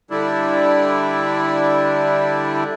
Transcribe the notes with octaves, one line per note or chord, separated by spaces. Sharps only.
D3 G3 D4 E4